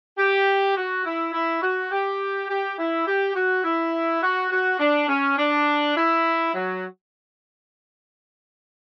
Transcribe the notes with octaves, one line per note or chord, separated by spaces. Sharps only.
G4
F#4
E4
E4
F#4
G4
G4
E4
G4
F#4
E4
F#4
F#4
D4
C#4
D4
E4
F#3